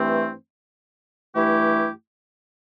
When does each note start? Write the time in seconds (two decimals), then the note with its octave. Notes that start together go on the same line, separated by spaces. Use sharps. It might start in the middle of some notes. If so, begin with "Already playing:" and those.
Already playing: G2 E3 A3 C4
1.35 G2 E3 A3 E4 G4